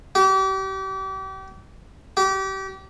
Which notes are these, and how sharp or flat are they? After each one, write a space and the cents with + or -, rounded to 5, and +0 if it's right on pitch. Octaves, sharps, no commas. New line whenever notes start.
G4 -35
G4 -30